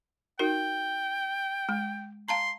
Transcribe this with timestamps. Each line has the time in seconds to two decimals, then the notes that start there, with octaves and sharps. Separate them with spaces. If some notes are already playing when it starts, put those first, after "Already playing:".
0.39 D#4 F#4 A#4 G5
1.69 G#3
2.28 F5 A5 A#5 C6